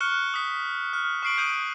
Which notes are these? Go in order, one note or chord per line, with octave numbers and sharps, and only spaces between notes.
C#6 F6 F#6 C#7 G7
D#6 B6
F6
C#6 F6 C7 D7 F#7
D#6 G6 D7 D#7 F#7